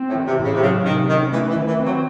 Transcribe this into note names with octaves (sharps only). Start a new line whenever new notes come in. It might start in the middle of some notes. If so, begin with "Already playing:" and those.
Already playing: C4
A2
E3
C3
A2
C#3
C3
C#3 F#3
C3 D#3
D#3 C#4
E3 A3
E3
D#3
E3
C4
F#3